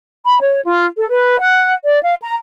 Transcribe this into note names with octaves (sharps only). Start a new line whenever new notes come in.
B5
C#5
F4
A4
B4
F#5
D5
F5
A#5